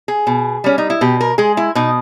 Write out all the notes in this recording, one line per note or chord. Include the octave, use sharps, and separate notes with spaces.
G#4
B2
G3 C#4
D#4
E4
B2 G4
A#4
G#3 G#4
E4
B2 D#4